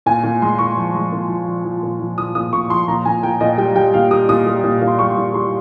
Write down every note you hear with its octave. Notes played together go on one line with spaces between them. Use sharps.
A#2 G#5
A#2
G#3 C6
A#2 C#6
F3
G#3
A#2
F3
F3
F3
A#2
F3
F3 D#6
A#2 D#6
A#2 C#6
F3 C6
A#2 A#5
A#2 G#5
A#2 G5
A#2 D#5
G3 G5
G3 G5
A#2 F5
G3 D#6
A#2 D#6
G3
A#2
A#2
C6
G3 C#6
A#2
G3 C6